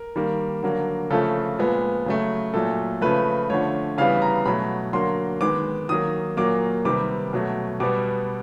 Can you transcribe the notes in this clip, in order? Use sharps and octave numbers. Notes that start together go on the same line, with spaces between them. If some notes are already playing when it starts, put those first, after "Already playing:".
Already playing: A#4
D#3 G3 A#3
D3 F#3 A#3
C#3 F3 A3 A4
A#2 F3 G#3 B3
C#3 F#3 A3
A#2 F#3 A3 A4
C#3 F3 A3 B4
D3 F3 A3 C#5
C#3 E3 G3 B3 F5
A#5
B2 F#3 A3 B5
D3 F#3 A#3 C6
D#3 G#3 B3 D6
D#3 F#3 A#3 D#6
A#2 F#3 A#3 D6
C3 D#3 G3 B3 D6
B2 F#3 A3
B2 G3 B3 D6